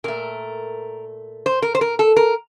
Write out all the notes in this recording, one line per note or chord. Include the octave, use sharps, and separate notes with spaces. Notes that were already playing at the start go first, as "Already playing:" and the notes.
A#2 A3 A#4
C5
A#4
C5
A#4
A4
A#4